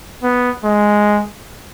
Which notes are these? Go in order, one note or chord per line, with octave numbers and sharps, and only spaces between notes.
B3
G#3